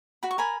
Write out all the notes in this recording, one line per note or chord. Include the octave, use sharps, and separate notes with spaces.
F#4 B5
C#6
A#4 G#5 B5